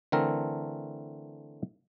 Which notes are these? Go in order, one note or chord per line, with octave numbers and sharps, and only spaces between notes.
D3 E3 A3 C4 A#4